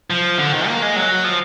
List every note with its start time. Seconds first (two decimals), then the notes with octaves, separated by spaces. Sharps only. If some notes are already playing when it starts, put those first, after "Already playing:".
0.10 F3
0.39 D3
0.54 D#3
0.67 A#3
0.82 G#3
0.96 F#3
1.25 F3